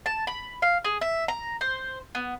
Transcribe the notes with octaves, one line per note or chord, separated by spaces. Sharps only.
A5
B5
F5
G#4
E5
A#5
C5
B3